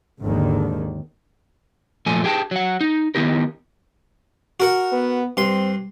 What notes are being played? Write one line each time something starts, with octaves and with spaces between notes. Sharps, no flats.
G#1 D#2 D3 D#3
F#2 A#2 F3 A3 G#5
G4 G#4 G5 A5
F#3 F#5
D#4
D#3 B3 E4 G4 A#4
F#4 A#4 F#5
B3
G2 C4 C6